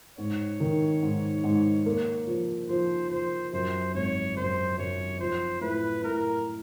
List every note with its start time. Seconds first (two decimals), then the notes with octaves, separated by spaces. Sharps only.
0.18 G#2 C#5
0.60 D#3
1.02 G#2
1.44 G#2
1.86 A#3
2.27 F3
2.69 F3 C5
3.10 F3 C5
3.53 F#2 C5
3.94 G#1 C#5
4.36 F#2 C5
4.78 F#2 C#5
5.20 F3 C5
5.61 A2 B4
6.03 A2 A#4